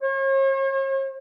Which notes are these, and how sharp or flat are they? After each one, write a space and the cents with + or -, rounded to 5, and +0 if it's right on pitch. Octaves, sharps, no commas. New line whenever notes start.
C#5 -45